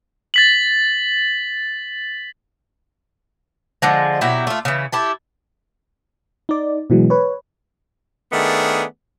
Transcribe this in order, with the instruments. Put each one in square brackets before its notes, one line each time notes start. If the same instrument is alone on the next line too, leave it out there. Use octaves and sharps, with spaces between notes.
[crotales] A6 B6 F#7
[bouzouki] D3 F3 G#3
B2 F#3 E4 G4
A3 F4
C#3 E3
E4 G4 A4
[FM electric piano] D#4 D5
B2 E3 F#3 G#3
B4 C#5
[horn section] D#3 A3 B3 D4 G#4